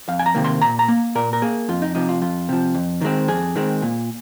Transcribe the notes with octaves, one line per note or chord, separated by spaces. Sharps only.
F2 F5
G#5
A#5
C3 D#3 A#3
C6
A#2 A#5
A#5
A#3
A#2 A#4
A#4
A#3 G#4
F2 F4
D#4
C3 F3 D#4
F4
F2 F4
C3 F3
F2
D#3 G#3 C4
F2 G#4
D#3 G#3 C4
A#2